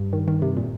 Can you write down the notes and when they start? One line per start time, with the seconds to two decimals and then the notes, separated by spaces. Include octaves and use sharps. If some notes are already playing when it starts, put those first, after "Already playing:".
Already playing: G2
0.13 D#3
0.28 D#3
0.42 C3
0.57 A#2